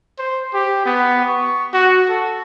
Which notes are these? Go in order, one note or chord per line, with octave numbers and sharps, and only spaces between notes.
C5
G4
B3
C#6
F#4
A4